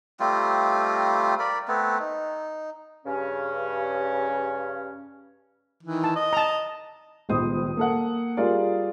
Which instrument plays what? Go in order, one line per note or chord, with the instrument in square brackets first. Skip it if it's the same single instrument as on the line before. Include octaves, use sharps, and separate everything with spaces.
[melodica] G3 A3 C4 F4
A#4 D5 B5
A3 B3 C4
D#4
[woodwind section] G2 C#3 C#4
[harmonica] D#3 E3
[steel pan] A5
[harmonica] D#5
[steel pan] A5 A#5
[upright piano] D#1 C#2 B3 C5 D#6
A#3 A4 F#5
G3 F4 G#4 A#4 D5